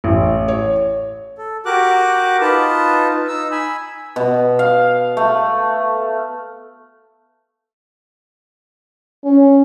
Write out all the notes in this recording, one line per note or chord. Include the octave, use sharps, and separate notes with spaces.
A1
C#5
A4
F#4 G4 A#4 D6 F#6
D#4 F4 B4 A5
D#4 E6
G#5 B5 E6
B2
F5
A3
C#4